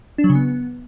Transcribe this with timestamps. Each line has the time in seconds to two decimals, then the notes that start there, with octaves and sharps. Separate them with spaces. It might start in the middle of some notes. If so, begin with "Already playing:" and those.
0.18 D4
0.24 F#3
0.30 C#3
0.35 B3